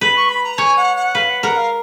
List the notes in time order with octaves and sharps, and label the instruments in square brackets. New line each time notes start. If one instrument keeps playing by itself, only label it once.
[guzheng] B4 [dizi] B5
[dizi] C#6
B5
A#5
[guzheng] C#5 [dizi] G#5
[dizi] F#5
F#5
[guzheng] B4 [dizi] F5
[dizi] F#5
[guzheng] A#4 [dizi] F#5
[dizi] F5